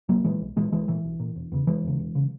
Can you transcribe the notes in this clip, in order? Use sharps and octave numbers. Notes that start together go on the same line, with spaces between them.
B1 F#3 A#3
A#2 E3 G#3
B1
A#2 E3 G#3
B1 E3 G#3
A#2 E3
B1
A#2
E1
E2 C#3
E1 E3 G#3
E2 C#3
E1
C#3